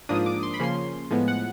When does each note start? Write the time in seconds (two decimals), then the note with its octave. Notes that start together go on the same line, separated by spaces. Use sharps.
0.09 G#2 F3 A#3 D4 D#6
0.26 D6
0.43 C6
0.54 B5
0.60 C#3 F3 A#3 C#4 C6
1.10 A2 F3 G#3 B3
1.28 F#5